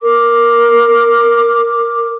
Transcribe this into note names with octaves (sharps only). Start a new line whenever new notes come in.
A#4 D6